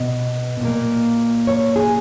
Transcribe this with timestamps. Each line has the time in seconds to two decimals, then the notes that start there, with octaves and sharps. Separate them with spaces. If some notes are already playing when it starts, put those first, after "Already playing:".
Already playing: B2 B3 D#5
0.60 A#2 A#3
1.47 C#5
1.76 G#4